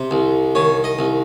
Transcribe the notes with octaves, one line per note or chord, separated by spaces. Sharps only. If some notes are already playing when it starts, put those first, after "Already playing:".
Already playing: C3 C5
C2
D#3 C#5
D#5
C2